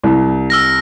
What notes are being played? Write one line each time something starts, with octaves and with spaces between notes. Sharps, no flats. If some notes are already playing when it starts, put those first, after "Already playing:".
C2
E6 F6 A#6